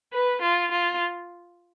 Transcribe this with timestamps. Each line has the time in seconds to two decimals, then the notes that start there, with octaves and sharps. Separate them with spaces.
0.13 B4
0.42 F4
0.72 F4